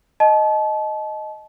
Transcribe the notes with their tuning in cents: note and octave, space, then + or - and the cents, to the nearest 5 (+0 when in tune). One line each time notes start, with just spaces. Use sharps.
D#5 +0 A5 -30